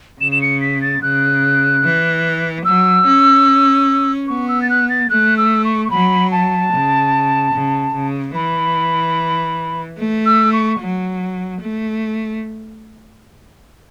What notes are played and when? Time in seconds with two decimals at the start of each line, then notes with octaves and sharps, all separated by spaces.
0.21 C#3 E7
0.32 E7
0.42 C#7
0.61 B6
0.81 A6
1.02 C#3 F#6
1.84 E3
2.65 F#3 E6
3.06 C#4
4.28 B3 C#6
4.48 E6
4.62 A6
4.69 F#6
4.89 A6
5.10 A3 F#6
5.37 E6
5.64 C#6
5.85 C#6
5.91 F#3 B5
6.32 A5
6.72 C#3
7.54 C#3
7.95 C#3
8.35 E3 B5
9.98 A3
10.26 E6
10.53 C#6
10.80 F#3
11.61 A3